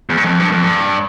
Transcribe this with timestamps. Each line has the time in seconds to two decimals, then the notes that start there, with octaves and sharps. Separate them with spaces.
0.09 E2
0.17 G2
0.24 F2
0.40 G2
0.52 F2
0.63 G2